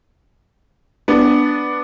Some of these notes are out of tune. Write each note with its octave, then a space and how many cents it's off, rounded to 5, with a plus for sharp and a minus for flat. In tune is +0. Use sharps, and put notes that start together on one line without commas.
B3 +0 D4 +0